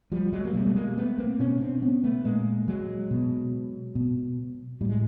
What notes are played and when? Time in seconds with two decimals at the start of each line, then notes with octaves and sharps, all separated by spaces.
0.12 F3 G3
0.33 F#3 G#3
0.45 A#3
0.54 B2 G3 A3
0.67 A3
0.76 G#3 A#3
0.98 A3 B3
1.18 A#3 C4
1.39 B2 B3 C#4
1.60 C4 D4
1.82 B3 C#4
2.03 A3 B3
2.24 A#2 G#3 A#3
2.68 F#3 G#3
3.11 B2
3.95 B2
4.81 A2 G3
4.89 G#3